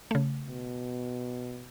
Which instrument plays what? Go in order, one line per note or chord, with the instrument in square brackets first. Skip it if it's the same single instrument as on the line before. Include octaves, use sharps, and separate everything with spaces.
[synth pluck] C#3 A3
[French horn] B2